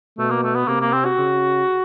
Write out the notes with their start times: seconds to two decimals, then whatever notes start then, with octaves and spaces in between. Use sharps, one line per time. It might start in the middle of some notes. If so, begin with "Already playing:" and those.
0.18 B2 A3
0.31 A#3
0.44 A3
0.56 B3
0.68 C3 A#3
0.81 A#3
0.93 C4
1.05 F#4
1.18 C#3